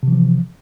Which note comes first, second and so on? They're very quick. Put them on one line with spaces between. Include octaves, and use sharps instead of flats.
C3 E3 F3